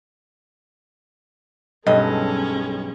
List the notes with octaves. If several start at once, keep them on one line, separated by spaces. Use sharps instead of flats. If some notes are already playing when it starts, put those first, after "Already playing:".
B1 G2 G#3 C#4 A4 D#5